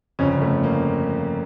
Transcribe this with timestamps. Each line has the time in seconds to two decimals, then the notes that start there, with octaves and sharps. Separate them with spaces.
0.19 G1 F2 C#3 C#4
0.41 A3
0.64 A#3